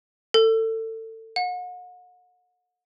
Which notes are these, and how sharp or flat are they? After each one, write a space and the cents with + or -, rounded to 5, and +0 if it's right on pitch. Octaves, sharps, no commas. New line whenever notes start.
A4 +30
F#5 -40